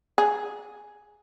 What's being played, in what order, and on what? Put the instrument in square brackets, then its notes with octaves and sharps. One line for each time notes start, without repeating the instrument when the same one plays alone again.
[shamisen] G#4